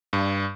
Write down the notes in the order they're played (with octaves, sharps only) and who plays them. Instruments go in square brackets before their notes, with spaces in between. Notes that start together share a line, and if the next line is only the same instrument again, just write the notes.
[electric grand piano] G2